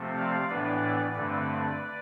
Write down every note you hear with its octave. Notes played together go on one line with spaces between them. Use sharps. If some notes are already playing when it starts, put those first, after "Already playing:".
Already playing: C3 F3 A3 C4
D5 F5
A2 E3 B3 D4 B4 D5
G2 D3 A3 C4 B4 D5